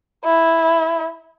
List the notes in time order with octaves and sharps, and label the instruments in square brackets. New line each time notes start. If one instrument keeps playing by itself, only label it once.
[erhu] E4